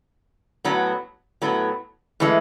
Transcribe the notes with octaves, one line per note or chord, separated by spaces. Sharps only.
A2 F#3 B3
A2 F#3 B3
A2 E3 G#3